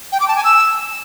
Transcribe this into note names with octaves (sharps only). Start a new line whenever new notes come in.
G5
D6
A5
G#5
E6